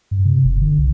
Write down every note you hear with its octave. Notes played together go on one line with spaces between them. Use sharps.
G2
C3
F1
D3
C2